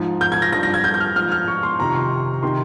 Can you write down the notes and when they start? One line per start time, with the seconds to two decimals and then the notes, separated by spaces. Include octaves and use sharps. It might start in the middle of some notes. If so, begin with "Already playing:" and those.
Already playing: G#2 F3
0.21 G6
0.32 G#6
0.42 A#6
0.52 G2 F3 A#6
0.63 A#6
0.74 G#6
0.84 G6
0.94 G6
1.00 F6
1.16 G#2 F3 F6
1.32 F6
1.48 C#6
1.63 C6
1.79 F2 C3 D#3 A#5
1.89 C#6
1.95 C6
2.43 C3 D#3 C6